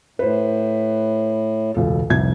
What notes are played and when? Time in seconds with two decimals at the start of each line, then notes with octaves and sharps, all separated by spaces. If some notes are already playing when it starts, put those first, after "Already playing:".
0.19 A2 B4 C5
1.74 E1 C#2 A4
2.10 F1 C2 G#6